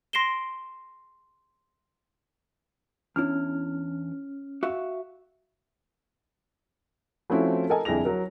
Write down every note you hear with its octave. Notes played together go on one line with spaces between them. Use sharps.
C6 A#6 C7 D7 E7 G7
E2 C#4 D4 E4 F6
F#4 E5 F5
F3 A3 C4 C#4 E4 F#4
A4 A#4 D#5 G#5
G1 F2 E4 G#4 A#6 F7
F#3 A#4